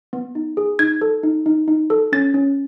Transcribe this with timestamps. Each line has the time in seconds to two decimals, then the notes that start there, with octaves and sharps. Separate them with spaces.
0.13 B3
0.35 D#4
0.57 G#4
0.79 D#4 G#6
1.01 A4
1.23 D#4
1.46 D#4
1.68 D#4
1.90 A4
2.12 C#4 A6
2.34 C#4